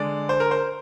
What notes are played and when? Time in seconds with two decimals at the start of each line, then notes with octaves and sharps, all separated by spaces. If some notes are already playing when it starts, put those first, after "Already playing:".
Already playing: D3 G#3 D5
0.29 C5
0.40 A#4
0.51 C5